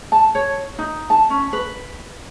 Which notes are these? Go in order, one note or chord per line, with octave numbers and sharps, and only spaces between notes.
A5
C#5
D#4
A5
C#4
B4